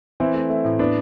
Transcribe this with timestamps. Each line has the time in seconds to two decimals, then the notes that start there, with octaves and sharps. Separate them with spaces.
0.20 E3 C4 E4
0.34 A3
0.50 A3
0.65 A2
0.79 A2 B3 D4